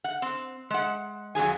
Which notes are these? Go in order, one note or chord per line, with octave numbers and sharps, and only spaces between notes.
F#5
C4
G#3 F#5
F2 F#3 G#4 G#5